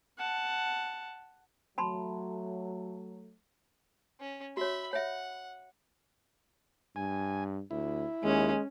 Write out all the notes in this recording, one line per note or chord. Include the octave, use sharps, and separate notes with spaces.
F#5 A5
F#3 A3 A5 B5 C6
C#4
F#4 C#5 E5 B5
C#5 E5 F#5
G2 G#5
D2 E4
D#2 G#3 C#4